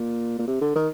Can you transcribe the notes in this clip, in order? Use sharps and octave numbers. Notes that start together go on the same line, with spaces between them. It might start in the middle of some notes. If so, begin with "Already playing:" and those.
Already playing: A#2
A#2
C3
D3
D#3